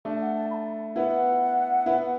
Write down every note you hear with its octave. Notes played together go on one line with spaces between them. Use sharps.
A3 D4 A5
F#5
A5
B5
A5
B3 E4 F#5
B3 E4